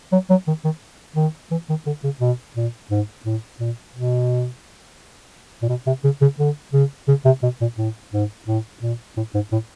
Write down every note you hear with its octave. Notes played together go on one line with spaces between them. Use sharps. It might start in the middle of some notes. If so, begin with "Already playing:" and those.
F#3
F#3
D#3
D#3
D#3
E3
D#3
D3
C#3
B2
A#2
G#2
A2
A#2
B2
A#2
B2
C3
C#3
C#3
D3
C#3
C#3
C3
B2
A#2
A2
G#2
A2
A#2
A2
G#2
A2